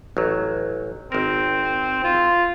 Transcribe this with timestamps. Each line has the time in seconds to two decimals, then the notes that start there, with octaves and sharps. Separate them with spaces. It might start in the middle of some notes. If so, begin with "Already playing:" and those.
0.17 A1 F#3
1.12 G#1 C4 A#4
2.04 F4